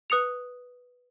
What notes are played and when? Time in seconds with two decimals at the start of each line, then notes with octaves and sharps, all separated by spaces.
0.10 B4 D#6 C#7 F7